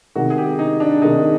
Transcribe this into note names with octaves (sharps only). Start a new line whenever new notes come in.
C3 D#3 G#3 F#4
G#4
G4
D#4
D4
C3 D#3 G#3 D#4